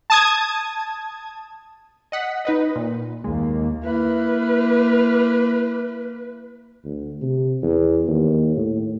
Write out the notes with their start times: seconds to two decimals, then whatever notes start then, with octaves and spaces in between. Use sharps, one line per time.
0.10 A5 D#6 G#6
2.12 D#5 F#5 B6
2.45 D#4 B4 D#5
2.76 A#2
3.24 D#2 G#3 A#3
3.84 A#3 E4 B4
6.85 D2
7.22 C3
7.63 E2
8.08 D#2
8.56 A2